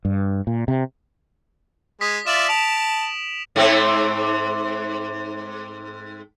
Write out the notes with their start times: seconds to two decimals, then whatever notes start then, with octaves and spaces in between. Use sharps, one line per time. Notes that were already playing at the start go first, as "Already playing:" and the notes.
0.05 G2
0.47 A#2
0.68 C3
2.01 G#3 D#6 B6
2.27 F4 D5 E5 E7 F#7
2.49 A5 D7 F7
2.77 B6
3.56 G#2 A3 C4